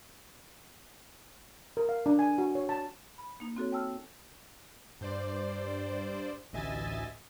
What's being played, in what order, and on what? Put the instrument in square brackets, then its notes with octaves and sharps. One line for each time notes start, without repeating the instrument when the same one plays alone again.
[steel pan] A#4
F5
D4
G#5
F#4
C#5
A5
[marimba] B5
A#3 D#4
C4 F#4 A4 C#5
C#5 G5 A5 E6 F6
[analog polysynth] G2 C5 D5
A1 D2 D#5 E5 G#5 A6